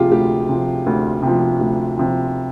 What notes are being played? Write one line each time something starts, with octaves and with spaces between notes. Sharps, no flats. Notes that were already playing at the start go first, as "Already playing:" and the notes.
Already playing: D2 C3 F3 F4 G4 G#4
D2 G4
C3 F3
D2
C3
F3
D2
C3 F3